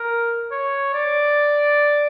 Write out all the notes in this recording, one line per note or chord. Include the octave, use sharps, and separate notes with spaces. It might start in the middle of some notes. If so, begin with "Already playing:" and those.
Already playing: A#4
C#5
D5